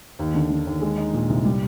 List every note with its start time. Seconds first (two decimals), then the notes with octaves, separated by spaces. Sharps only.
0.19 D#2
0.35 D3
0.50 D3
0.66 D#2
0.82 G#3
0.98 D#4
1.13 A#2
1.29 C2
1.45 G3